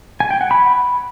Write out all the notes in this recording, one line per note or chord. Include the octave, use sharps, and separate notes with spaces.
G#5
G5
F#5
B5